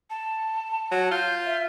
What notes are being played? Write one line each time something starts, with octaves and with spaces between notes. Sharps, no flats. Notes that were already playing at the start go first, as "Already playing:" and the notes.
A5
F#3
F4 G6
E5